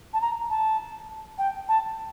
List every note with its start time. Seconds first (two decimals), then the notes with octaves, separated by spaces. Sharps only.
0.13 A5
0.21 A#5
0.50 A5
1.38 G5
1.68 A5